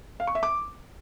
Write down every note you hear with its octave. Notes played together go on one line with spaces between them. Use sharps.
F5
C#6
E5
D6